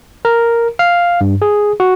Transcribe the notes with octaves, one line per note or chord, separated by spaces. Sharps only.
A#4
F5
G2
G#4
F#4